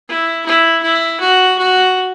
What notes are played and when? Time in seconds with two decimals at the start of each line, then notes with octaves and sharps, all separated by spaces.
0.08 E4
0.46 E4
0.82 E4
1.20 F#4
1.58 F#4